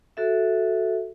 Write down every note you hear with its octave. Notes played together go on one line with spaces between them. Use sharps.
F#4 A4 E5